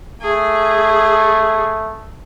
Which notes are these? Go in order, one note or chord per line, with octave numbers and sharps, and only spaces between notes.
A3 G#4